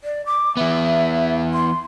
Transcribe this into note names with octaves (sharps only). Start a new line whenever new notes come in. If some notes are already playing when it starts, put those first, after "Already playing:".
D5
D6
E3 B3 E5
C6